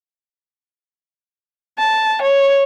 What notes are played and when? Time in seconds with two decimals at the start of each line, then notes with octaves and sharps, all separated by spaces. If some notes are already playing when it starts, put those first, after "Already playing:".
1.78 A5
2.22 C#5